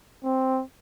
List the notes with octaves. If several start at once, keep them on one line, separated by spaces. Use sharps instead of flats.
C4